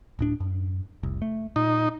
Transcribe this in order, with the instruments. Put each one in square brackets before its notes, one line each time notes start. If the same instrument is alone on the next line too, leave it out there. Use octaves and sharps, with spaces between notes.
[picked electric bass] D1 A2 D4
F#2
F1 C2
A3
[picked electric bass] A#2 [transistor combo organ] D#4